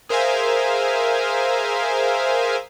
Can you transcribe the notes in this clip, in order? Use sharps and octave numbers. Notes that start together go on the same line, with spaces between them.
G#4 A#4 C5 E5 F5 G#5